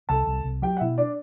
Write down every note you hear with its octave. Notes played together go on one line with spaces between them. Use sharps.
C2 A4 A5
C2
C2
F#3 G4 G5
F#5
B2 E4 E5
D4 D5